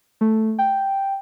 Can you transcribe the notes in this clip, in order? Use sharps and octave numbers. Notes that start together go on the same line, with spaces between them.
A3
G5